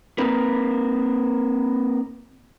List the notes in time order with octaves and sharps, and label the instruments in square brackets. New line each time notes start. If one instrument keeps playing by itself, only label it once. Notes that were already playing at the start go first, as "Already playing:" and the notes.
[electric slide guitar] A#3 C4 D#4 A#4 B4